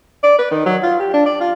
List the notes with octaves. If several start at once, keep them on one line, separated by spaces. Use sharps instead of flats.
D5
B4
D#3
F#3
F4
G4
D4
D5
F4